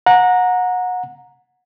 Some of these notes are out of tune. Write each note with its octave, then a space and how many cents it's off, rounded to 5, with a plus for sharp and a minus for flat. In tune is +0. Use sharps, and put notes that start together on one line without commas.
F#5 -25 A#5 +0